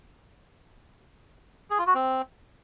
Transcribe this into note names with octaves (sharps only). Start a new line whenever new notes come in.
G#4
F4
F#4
C4